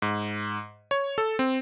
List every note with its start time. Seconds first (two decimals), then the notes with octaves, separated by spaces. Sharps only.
0.02 G#2
0.91 C#5
1.18 A4
1.39 C4